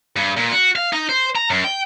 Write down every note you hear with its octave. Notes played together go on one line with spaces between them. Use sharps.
G2
A#2
F#4
F5
D#4
C5
A#5
F#2
G5